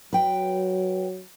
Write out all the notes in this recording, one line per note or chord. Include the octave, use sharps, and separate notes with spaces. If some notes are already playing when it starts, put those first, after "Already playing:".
F#3 B4 G5